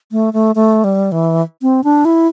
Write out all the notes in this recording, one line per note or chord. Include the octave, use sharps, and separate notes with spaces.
A3
A3
A3
G3
E3
C4
D4
E4